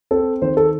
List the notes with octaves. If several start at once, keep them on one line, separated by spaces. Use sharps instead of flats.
C4 A4
D#3 C5
A4